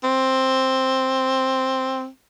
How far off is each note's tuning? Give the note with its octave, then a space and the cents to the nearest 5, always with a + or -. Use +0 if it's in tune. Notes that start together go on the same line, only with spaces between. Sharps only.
C4 +5